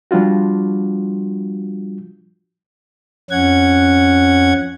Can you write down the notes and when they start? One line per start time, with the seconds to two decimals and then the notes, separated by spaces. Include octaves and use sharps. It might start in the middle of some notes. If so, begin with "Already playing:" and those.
0.11 F3 G3 D4 F4 F#4
3.31 F2 C#4 F#5 G#6